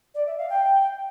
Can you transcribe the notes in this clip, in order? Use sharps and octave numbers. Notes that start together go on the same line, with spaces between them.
D5
E5
F5
G5